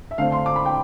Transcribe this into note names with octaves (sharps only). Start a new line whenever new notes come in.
E5
D3 A3 C4 F5
C6
D6
B5
G5